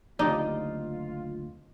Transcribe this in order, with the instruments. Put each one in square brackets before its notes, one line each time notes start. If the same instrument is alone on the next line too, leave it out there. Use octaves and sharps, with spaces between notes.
[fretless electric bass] F#1 D2 C4 [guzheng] D#4 [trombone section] F4 [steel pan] G4 D5